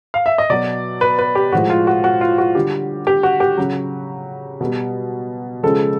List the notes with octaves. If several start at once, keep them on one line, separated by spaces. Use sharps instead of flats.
F5
E5
D#5
B2 F#3 D5
B4
B4
G4
A2 F3 G#3 F#4
F4
F#4
F#4
F4
F#4
D3 G3 G4
G4
F#4
G4
C#3 F#3
B2 G3
C#3 F3 G#3 A4